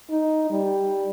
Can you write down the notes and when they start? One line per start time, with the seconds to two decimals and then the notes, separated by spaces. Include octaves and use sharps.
0.11 D#4
0.51 G3